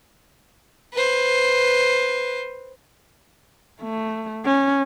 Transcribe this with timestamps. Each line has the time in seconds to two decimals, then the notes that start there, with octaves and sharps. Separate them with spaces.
0.93 B4 C5
3.82 A3
4.46 C#4